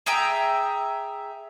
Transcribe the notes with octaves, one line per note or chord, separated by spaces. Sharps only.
G#4 E5 G5 A#5